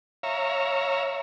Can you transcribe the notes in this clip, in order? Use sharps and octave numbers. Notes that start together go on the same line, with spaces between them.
C#5 E5 F5 A#5